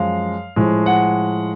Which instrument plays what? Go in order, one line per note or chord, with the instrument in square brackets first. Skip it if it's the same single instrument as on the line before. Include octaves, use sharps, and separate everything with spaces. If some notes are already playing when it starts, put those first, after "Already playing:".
Already playing: [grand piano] F#2 F3 G#3 F5
A2 F3 G#3
F#5